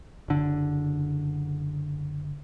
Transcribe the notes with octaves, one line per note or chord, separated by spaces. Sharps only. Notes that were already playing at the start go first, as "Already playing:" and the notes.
F#1 D3